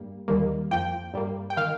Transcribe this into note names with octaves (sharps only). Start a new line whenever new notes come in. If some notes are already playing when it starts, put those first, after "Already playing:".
Already playing: G2 G3 A#3
D#2 D#3 G3 A#3
F2 F3 A#3 G5
G2 G3 A#3
G5
D#3 A#3 F5